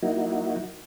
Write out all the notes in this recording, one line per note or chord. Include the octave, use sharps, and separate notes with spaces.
F#3 A#3 D#4 E4 F#4